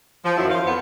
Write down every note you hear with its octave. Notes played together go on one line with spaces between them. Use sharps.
F3
F#2 D#3 F#3 E4
C5 F5
F2 B3